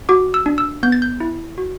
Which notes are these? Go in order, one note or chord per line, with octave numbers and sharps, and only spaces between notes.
F#4 D6
E6
D4
E6
B3 G6
A6
G6
E4
F#4